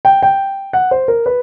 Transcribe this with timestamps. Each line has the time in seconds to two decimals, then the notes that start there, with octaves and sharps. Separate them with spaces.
0.05 G5
0.23 G5
0.73 F#5
0.91 C5
1.08 A#4
1.26 B4